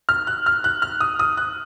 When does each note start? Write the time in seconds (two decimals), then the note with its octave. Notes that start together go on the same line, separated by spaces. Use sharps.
0.09 F6
0.27 F#6
0.46 F6
0.64 F#6
0.82 F6
1.01 D#6
1.19 D#6
1.37 F#6